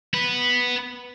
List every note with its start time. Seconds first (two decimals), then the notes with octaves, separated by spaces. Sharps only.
0.14 B3 B4